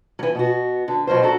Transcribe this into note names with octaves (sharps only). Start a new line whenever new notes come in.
E3 F#3
B2 B3 F#4
D3
B2 F#3 F4 C5
D4 F#4 A4 A#5